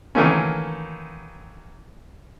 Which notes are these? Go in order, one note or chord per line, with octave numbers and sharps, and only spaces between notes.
D#3 E3 F#3 A3 A#3 C#4